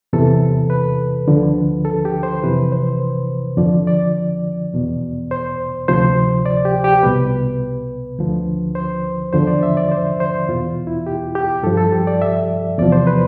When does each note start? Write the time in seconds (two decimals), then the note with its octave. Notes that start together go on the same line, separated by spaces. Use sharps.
0.13 E2 C3 E3 A4
0.70 B4
1.28 D2 D3 F3
1.85 A4
2.05 G4
2.23 C5
2.43 F2 C3 E3 B4
2.72 C5
3.57 F2 D3 F3 D5
3.87 D5
4.74 E2 B2
5.31 C5
5.88 D2 C3 F3 C5
6.46 D5
6.65 G4
6.84 G4
7.03 C2 B2 B4
8.18 D2 D3 F3
8.75 C5
9.33 E2 D3 F3 C5
9.47 D5
9.63 E5
9.77 D5
9.91 C5
10.20 C5
10.49 E2 B2 F4
10.87 E4
11.06 G4
11.35 G4
11.63 G2 F3 A4
11.77 A4
11.92 G4
12.07 D5
12.22 E5
12.79 E2 C3 F3 D5
12.92 C5
13.07 B4